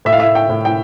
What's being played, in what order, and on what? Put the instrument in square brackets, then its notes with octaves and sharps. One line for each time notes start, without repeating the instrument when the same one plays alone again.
[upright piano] A2 E5
F5
E5
G5
A2
G5